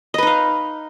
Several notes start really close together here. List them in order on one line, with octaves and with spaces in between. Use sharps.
D#5 B4 D#4 F5